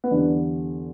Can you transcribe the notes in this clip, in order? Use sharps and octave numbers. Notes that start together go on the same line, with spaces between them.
B3
E2 D3 G3 D4